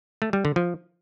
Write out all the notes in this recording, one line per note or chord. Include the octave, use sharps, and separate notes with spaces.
A3
G3
D3
F3